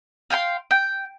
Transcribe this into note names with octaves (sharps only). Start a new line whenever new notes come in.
F5 G5 G#5 C6
G5